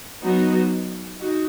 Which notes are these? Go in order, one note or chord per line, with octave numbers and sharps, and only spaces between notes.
F#3 B3 D#4 F#4
D#4 F#4